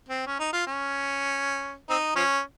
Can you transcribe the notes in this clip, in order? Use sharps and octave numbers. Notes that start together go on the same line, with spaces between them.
C4
C#4
D#4
F4
C#4
C4 D#4
F3 C#4